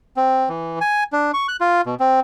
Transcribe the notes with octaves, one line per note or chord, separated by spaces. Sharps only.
C4
E3
G#5
D4
C#6
F#6
F4
B2
C4